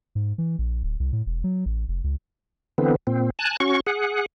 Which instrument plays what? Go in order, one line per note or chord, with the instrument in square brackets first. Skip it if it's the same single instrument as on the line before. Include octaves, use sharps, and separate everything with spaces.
[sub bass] G#2
E3
A#1
D1
C2
A2
E1
F#3
A1
F1
C#2
[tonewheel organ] D3 E3 B3 C4
A#2 C4
G#5 A5 F#6
C#4 F#4 C#6
G#4 F#5